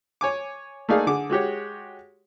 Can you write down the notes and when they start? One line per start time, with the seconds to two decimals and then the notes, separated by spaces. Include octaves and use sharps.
0.21 C#5 G#5 D6
0.89 A3 A#3 D#4 G#4 D5 F5
1.07 D3 G#4 D6
1.30 G#3 F#4 G4 C#5